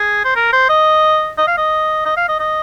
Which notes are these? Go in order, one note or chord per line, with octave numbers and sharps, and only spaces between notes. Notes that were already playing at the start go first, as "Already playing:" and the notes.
Already playing: G#4
C5
A#4
C5
D#5
D#5
F5
D#5
D#5
F5
D#5
D#5